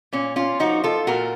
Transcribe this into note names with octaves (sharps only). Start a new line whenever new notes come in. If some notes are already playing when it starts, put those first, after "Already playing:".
A#2 C#4
C#4 F4
F3 A#3 D#4 F#4
F4 A4
A#2 F#4 A#4